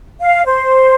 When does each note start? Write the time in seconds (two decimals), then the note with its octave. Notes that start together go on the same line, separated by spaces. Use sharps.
0.21 F5
0.46 C5